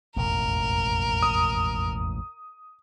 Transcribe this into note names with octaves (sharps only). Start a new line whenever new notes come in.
E1 A1 F2 A#4
D#6